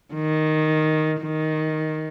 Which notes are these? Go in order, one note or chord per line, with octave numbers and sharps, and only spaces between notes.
D#3
D#3